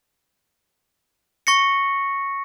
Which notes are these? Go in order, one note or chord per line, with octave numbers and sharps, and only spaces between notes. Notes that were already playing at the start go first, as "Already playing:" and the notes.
C#6 A#6 C#7